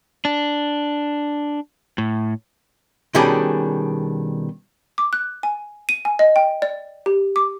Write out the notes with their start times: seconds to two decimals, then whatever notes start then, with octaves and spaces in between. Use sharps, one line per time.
0.25 D4
1.98 A2
3.15 B2 D#3 G3 C#4 D4 G#4
4.98 D6
5.13 F#6
5.43 G#5
5.89 D#7
6.05 G#5
6.19 D#5
6.36 G5
6.62 D5
7.06 G4
7.36 D6